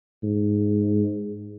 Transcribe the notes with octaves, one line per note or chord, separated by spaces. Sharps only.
G#2